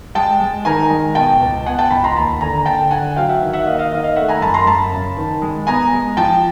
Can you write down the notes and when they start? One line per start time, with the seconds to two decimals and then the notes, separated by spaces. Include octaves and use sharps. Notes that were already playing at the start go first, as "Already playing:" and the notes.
0.15 G#3 G5 A5
0.40 G#3
0.65 D#3 G#5 A#5
0.90 G#3
1.15 B2 G5 A5
1.41 C#2
1.66 B3 F#5 G#5
1.79 G5 A5
1.90 C#2 A5 B5
2.04 A#5 C6
2.16 D#2 A5 B5
2.41 D3 G#5 A#5
2.66 D3 G5 A5
2.91 D3 F#5 G#5
3.16 F#3 F5 G5
3.29 E5 F#5
3.41 D#3
3.53 E5 F#5
3.66 A#3 D#5 F5
3.78 D#5 F5
3.92 D#3 D#5 F5
4.04 D#5 F5
4.16 A3 E5 F#5
4.29 G#5 A#5
4.41 F#2 A5 B5
4.54 A#5 C6
4.66 F#2 A5 B5
4.92 C#3
5.17 D#3
5.42 G#3
5.67 B3 G#5 A#5
5.93 G#3
6.17 F3 G5 A5